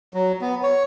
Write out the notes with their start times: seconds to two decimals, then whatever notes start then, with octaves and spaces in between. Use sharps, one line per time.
0.14 F#3
0.41 B3
0.63 C#5